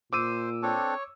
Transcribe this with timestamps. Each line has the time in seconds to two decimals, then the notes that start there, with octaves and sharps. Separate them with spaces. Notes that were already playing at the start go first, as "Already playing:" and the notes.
0.13 A#2 C5 D6 E6 D#7
0.63 C4 D4 A4 C#5